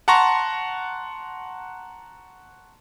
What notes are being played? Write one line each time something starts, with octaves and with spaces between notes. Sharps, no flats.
F#5 A5 A#5 C6 C#6 A#6